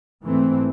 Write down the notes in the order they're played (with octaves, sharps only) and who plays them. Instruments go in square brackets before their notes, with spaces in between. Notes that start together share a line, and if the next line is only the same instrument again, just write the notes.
[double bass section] G#2 E3 A3 C4